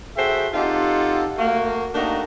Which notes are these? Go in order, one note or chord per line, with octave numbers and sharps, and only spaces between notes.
F#4 G#4 A4 C5 E5 G5
C4 D#4 F4 G4 A4 F#5
A3 A#3 F#4
A3 A#3 D4 D#4 F#4 G4